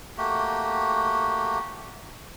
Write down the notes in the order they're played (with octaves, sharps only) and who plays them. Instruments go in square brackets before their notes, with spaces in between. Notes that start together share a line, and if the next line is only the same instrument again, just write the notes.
[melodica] A3 A#3 F#4 G4